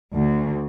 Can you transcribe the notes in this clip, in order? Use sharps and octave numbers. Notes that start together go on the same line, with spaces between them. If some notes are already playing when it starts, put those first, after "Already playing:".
D2